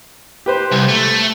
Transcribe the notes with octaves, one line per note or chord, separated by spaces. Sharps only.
G4 B4 C5
C2
A3